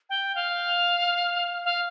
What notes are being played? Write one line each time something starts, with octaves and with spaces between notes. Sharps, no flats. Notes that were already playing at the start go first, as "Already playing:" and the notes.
G5
F5
F5